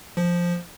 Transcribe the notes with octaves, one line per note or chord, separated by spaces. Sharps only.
F3